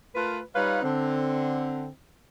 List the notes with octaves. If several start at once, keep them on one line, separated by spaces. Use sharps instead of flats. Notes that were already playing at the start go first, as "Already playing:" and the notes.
A3 F4 A#4 B4
G3 D#4 F4 B4 C#5 F5
D3 C4